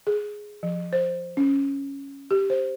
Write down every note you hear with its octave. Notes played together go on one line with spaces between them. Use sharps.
G#4
F3
C5
C#4
G4
C5